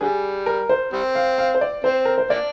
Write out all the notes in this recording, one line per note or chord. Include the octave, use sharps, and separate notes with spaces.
D3 G3 G#4
A#4
C5
G3 C4
F5
F5
C5
D5
C4 C5
A#4
C5
A#3 D4 D5